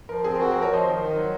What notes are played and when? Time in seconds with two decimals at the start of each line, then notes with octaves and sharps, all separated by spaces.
0.09 F3 A#4
0.24 C4 G#4
0.36 A#4
0.39 F#4 G#4
0.51 A#4
0.54 F3
0.61 A#4 C#5
0.69 F3 C5 D#5
0.85 D#3
1.00 D#3
1.15 F#3